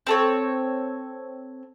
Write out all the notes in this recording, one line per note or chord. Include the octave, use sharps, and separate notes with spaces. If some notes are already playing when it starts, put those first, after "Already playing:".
C4 A4 C#5